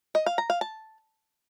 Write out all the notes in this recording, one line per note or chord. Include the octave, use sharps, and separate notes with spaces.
D#5
F5
A#5
F5
A5